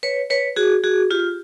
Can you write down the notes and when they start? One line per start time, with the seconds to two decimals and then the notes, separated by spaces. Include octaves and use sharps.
0.03 B4 C#5
0.30 B4 C#5
0.56 F#4 G#4
0.84 F#4 G#4
1.11 F4 G4